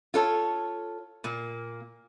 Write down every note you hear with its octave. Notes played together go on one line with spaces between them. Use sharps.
F4 A4 C#5
A#2 A#3